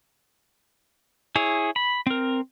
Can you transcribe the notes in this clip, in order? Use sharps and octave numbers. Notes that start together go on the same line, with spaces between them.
E4 G#4 C#5
B5
C4 A#4